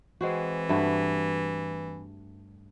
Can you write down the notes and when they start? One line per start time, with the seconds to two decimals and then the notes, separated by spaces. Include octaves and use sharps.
0.21 E3 G#3 C4 F#4
0.69 G2 A3 F#4